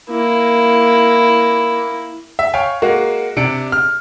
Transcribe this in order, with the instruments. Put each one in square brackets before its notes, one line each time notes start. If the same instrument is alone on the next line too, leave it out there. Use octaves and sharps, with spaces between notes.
[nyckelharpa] A#3 E4
[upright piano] E5
C#5 F5 G5 G#5
G#3 A#3 F#4
C3 D4 C#7 D7
F6